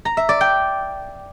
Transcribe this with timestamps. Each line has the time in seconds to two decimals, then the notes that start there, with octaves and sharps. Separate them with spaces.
0.05 A#5
0.17 E5
0.29 D5
0.41 G5